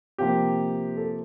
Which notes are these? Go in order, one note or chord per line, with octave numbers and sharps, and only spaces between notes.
C3 F3 A#3 G4
A4